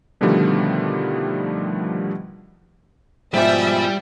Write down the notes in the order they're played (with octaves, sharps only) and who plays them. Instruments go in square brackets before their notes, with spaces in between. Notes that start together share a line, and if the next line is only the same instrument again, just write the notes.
[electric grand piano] B2 D3 D#3 F3 G3 A3
[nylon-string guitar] G#2 B2 F3 [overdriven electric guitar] G3 D5 [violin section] E5